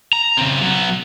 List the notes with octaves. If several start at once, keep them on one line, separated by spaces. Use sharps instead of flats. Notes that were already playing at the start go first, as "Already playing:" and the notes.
A#5
C#3 C4
F#3 B3